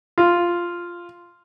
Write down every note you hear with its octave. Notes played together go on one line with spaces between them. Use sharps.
F4